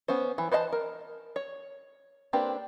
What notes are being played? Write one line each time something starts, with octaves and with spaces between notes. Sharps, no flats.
B3 C#4 C5
E3
B4 C5 D#5 F5 A5
A#4
C#5
A#3 C4 D4 G4 B4